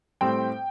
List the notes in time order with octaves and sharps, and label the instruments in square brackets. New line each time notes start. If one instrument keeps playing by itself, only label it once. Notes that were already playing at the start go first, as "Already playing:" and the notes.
[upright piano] A2 G3 C4 G5